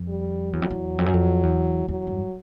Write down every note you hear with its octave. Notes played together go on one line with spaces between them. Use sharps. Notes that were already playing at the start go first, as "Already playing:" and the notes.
Already playing: F2
G3
E2 F#3
F2
E2
F2
F#2
F2
E2
E2 F#3
G2